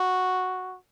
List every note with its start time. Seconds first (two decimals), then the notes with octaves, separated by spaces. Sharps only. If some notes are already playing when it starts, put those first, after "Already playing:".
Already playing: F#4